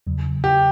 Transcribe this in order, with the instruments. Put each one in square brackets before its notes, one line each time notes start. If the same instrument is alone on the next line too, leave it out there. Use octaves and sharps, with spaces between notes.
[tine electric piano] E2 C#3 F#3
[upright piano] G4